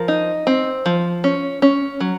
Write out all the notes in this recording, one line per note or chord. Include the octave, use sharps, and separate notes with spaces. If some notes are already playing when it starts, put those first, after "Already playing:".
Already playing: F3 A#4
D#4
C4
F3
C#4
C#4
F#3